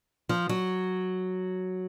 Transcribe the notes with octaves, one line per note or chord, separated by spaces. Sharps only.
F3
F#3